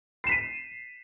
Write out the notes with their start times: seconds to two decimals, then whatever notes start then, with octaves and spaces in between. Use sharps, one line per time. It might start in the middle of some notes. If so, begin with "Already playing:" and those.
0.24 C7
0.27 E7
0.29 B6
0.32 D#7